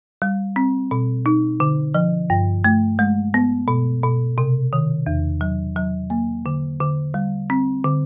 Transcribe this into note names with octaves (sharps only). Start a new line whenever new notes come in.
G3
C4
B2
D#4
D3
F3
G2
A3
G#3
B3
B2
B2
C3
D#3
E2
F#3
F#3
A#3
D3
D3
G3
C4
D3